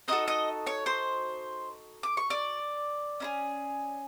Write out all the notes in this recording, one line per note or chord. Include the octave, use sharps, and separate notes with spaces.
C4 D#4 F#4 A4 D#5 D#6
D#5 D#6
C#5 C#6
C5 C6
D6
C#6
D5 D6
C#4 E4 G#4